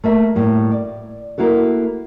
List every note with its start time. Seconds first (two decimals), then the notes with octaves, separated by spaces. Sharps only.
0.04 A3 A#3 E5
0.35 A2 G3 A#3
0.72 D5
1.38 A#3 E4 F#4 A4